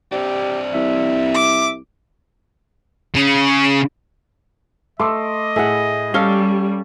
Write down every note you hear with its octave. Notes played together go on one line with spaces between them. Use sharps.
C4 D4 G4
C2 E5
D6
C#3
A3 D#5 C6 D6 E6
A2 E4 G#4 E5 F#5
G3 C#4 A4 F5 G7